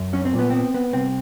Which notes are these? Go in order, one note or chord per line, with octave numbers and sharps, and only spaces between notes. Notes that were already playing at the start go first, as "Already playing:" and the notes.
Already playing: F#2
F#3 C#4
C4
A#2
B3
B3 C4
B3
C2 C4